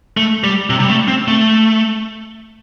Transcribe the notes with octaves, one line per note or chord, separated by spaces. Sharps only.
A3
G3
C3
G3
A3
C4
A3